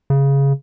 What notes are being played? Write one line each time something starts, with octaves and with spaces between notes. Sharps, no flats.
C#3